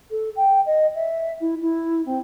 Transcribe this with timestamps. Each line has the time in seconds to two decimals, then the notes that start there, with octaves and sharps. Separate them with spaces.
0.10 A4
0.36 G5
0.65 D#5
0.94 E5
1.40 E4
1.61 E4
2.05 C4